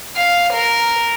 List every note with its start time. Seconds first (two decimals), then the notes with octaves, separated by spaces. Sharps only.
0.16 F5
0.53 A#4